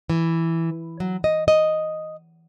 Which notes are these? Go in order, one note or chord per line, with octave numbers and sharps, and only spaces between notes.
E3
F#3
D#5
D#5